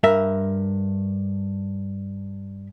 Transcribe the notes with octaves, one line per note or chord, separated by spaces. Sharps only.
G2 A#4 E5